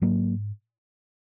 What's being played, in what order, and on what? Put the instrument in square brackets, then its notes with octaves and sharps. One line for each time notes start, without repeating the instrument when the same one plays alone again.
[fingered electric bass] G#2 F#3 A#3